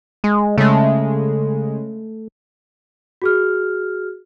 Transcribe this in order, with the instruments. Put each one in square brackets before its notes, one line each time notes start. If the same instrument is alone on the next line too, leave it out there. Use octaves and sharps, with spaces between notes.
[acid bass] G#3
[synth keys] C#3 G#3 [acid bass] A3
[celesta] F#4 G#4 F6